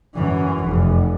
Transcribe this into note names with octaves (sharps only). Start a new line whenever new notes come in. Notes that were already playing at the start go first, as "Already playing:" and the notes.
F#2 E3
F1